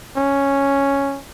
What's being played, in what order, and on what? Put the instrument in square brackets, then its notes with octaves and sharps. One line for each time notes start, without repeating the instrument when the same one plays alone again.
[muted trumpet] C#4